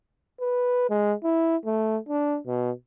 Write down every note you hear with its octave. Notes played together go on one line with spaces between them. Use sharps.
B4
G#3
E4
A3
D4
B2